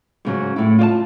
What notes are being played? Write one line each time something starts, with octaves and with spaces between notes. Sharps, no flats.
G#2 C#3 F#3
A2 E4
F4 D5 A5